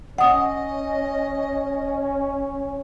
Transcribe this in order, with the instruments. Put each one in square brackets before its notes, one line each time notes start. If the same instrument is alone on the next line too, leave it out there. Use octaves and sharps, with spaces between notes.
[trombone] C#4 [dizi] D#5 [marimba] F#5 D#6